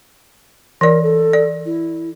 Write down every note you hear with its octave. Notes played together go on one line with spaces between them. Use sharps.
E3 A#4 D5
A4
D5
E4